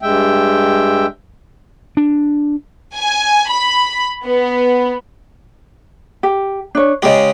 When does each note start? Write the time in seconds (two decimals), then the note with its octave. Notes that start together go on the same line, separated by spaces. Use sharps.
0.02 G2 G#3 E5 G5
1.97 D4
2.96 G#5
3.51 B5
4.28 B3
6.23 G4
6.75 D4 C#5
7.02 C#3 G#3 G4 G#4 D#5